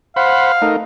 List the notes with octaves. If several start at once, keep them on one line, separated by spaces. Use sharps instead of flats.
C5 F5 F#5 B5
A3 D#4 A#4